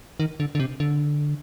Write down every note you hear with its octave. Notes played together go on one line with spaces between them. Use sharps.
D#3
D3
D3
C3
D3